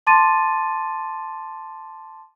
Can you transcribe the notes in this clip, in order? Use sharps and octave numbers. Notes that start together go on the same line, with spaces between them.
A5 C6 D6 A6 D#7